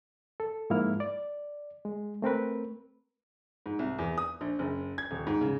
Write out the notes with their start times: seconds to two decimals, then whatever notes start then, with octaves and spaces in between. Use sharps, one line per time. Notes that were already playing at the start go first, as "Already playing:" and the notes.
0.40 A4
0.70 G#2 F3 A#3 E4 F6
1.00 D5
1.85 G#3
2.22 A3 C4 A#4 B4
3.66 G#2
3.79 C2
3.99 E2
4.18 D#6
4.41 A#1
4.59 F#1
4.98 G#6
5.11 D#1
5.27 G#2
5.41 C#3